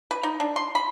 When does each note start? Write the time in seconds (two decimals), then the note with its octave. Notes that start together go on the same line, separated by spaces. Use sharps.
0.11 B4
0.23 D#4
0.40 D4
0.56 C6
0.75 B5